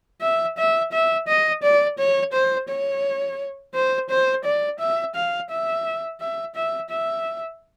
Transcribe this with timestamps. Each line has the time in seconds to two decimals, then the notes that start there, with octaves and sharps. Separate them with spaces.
0.21 E5
0.58 E5
0.92 E5
1.28 D#5
1.63 D5
1.99 C#5
2.33 C5
2.69 C#5
3.74 C5
4.10 C5
4.44 D5
4.80 E5
5.15 F5
5.50 E5
6.20 E5
6.56 E5
6.90 E5